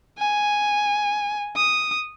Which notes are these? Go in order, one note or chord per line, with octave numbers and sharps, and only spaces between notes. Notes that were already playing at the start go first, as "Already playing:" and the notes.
G#5
D#6